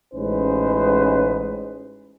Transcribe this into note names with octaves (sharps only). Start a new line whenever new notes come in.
A1 G#3 C#4 D#4 B4 C5